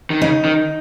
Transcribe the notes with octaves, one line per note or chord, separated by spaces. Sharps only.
D#3
C#3 D#4
D#3